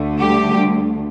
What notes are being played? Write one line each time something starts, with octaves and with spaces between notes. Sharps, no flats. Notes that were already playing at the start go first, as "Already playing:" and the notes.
Already playing: D2 D3 A3
G3 G4